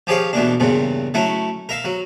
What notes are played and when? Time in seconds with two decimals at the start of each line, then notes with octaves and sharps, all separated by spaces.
0.07 F3 G4 G#4 C#5 F5
0.33 B2 E3 A#3 D4
0.60 E2 G2 A#2 C#3
1.14 F#3 A3 C#4 E4
1.69 A#4 E5 F5
1.84 F#3